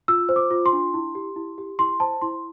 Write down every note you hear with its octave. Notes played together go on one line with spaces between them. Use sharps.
F4 E6
C5
D6
F4
C6
D4
E4
G4
E4
G4
E4 C6
C5 A5
E4 C6